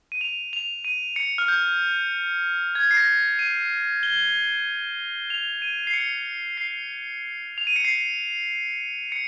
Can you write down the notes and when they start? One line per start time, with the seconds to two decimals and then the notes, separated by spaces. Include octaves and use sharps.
0.12 D#7
0.21 F7
0.53 F7
0.85 D#7
1.16 C#7
1.38 F6
1.48 G6
2.75 G#6
2.91 C7
2.97 A#6
3.39 D#7
4.03 G7
5.30 F7
5.62 D#7
5.87 C7
5.94 C#7
6.57 C7
7.58 F7
7.67 D#7
7.76 C#7
7.85 C7
9.12 C#7